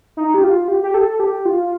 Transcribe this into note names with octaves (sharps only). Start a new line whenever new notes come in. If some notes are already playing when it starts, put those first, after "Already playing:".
D#4
G4
F4
G4
G4
A4
G4
F4